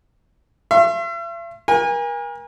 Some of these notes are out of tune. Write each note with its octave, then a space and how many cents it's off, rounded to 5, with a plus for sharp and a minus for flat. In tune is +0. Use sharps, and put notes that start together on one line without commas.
E5 +45 C6 +45
A#4 +35 G#5 -30